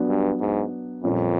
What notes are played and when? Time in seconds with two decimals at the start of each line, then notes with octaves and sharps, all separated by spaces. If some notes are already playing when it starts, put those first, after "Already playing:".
Already playing: F#3 B3 D4 F#4
0.08 G2
0.41 G#2
1.03 F2 A#2 G3 A#3 C#4 F4